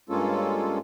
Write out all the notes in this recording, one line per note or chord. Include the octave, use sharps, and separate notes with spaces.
G2 G#3 A#3 C#4 F4 A4